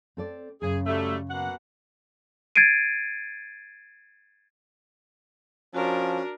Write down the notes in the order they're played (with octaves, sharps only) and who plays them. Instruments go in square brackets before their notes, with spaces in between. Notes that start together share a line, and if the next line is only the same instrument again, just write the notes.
[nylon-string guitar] C4 A4 D5
[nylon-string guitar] F#2 C#3 [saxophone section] G#4
[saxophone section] F#3 G3 A3
B2 A#3 F#5
[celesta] G#6 A6 C7 D7 D#7
[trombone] F3 [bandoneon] C#4 [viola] D4 A#4 [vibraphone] F#4